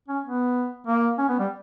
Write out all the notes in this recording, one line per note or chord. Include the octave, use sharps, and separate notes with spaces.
C#4
B3
A#3
C#4
B3
G3